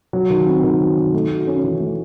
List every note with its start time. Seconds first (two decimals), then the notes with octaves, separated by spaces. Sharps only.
0.13 F#3
0.30 D#3
0.46 C4
0.64 D#3
0.80 F#3
0.97 D#3
1.13 A3
1.31 F#4
1.47 C#4
1.64 E3
1.80 A3